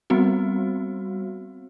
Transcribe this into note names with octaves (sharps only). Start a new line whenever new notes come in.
G3 B3 C4 F#4